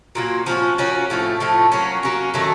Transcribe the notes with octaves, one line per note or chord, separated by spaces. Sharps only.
A#2 F#3 A#3
F3 A#3 C#4 F#4
F3 A#3 C#4 F#4
A2 F3 A3
A2 F3 A3
F#3 A#3 C#4
F#3 A#3 C#4
D#3 F#3 A3